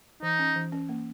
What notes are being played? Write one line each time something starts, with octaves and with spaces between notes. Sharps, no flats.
E3 D#4
C#4
E3
C#4
A#3